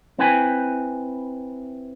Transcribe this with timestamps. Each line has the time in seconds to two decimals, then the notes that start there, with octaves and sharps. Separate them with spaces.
0.19 C4 E4 B4 G5 G#5